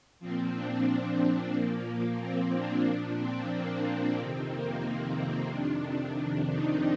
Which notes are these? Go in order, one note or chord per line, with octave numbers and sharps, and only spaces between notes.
A#2 F3 C4
D4
C4
C4
A#2 F3 A#3
C4
D4
A#2 F3
C4
A#3
F2 C3 D#3 C4
A#3
C4
F2 C3 D#3 D4
D#4